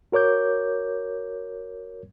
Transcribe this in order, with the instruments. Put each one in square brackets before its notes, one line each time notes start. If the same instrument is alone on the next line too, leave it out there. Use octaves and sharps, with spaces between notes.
[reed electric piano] F#4 A#4 C#5 D6 G6